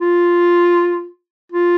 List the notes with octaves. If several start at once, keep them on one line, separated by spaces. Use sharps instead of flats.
F4
F4